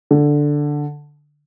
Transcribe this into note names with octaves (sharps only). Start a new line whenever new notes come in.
D3